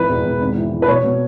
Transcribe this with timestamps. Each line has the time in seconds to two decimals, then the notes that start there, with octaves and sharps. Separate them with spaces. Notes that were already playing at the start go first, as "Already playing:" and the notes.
Already playing: G#1 E3 B4
0.09 E1
0.24 E1
0.41 G#1
0.56 E3
0.72 E3
0.82 B4
0.88 B2 C#5
1.04 B2